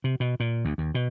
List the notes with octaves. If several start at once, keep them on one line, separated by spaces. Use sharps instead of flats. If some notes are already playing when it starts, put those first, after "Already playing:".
C3
B2
A#2
D2
D#2
B2